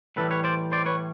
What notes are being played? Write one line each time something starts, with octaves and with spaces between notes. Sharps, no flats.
A2 E3 G3 A4 B4
B4 C#5
C5 D5
C5 D5
B4 C#5